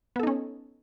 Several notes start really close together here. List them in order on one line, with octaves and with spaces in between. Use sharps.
B3 A4 D#4 C#4